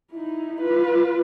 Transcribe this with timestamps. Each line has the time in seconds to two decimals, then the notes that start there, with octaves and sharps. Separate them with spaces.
0.12 D#4 E4
0.61 F4 B4